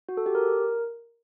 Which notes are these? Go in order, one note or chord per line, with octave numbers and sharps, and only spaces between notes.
F#4
A4
G4
A#4